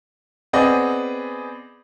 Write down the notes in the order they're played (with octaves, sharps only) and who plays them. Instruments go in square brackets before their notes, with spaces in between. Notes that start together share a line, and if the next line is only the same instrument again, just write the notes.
[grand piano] B3 C4 G#4 B4 D5 D#5